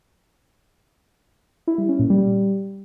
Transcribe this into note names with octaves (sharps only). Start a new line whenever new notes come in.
E4
G3
C#4
A#2
G3